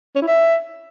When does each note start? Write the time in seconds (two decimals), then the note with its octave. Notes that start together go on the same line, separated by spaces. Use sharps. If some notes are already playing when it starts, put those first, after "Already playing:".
0.16 C#4
0.22 E4
0.28 E5